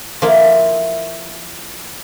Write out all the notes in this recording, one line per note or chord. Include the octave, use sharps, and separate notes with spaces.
F3 A#3 E4